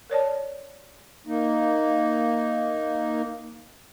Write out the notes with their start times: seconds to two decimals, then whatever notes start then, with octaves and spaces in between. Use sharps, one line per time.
0.10 A#4 C#5 D5 A5
1.27 A#3 D#4